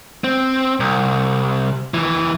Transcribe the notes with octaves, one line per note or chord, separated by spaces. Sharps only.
C4
C2
D#2 E3